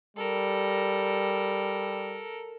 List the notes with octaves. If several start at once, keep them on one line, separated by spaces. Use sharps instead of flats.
G3 A4 A#4